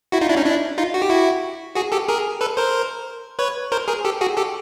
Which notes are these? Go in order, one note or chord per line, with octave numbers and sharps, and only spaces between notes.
E4 F#4
D#4 F4
D4 E4
C#4 D#4
D4 E4
D#4 F4
F#4
G4
E4 F#4
F#4 G#4
G4 A4
G#4 A#4
A4 B4
A#4 C5
B4 C#5
A#4 C5
G#4 A#4
G4 A4
F#4 G#4
G4 A4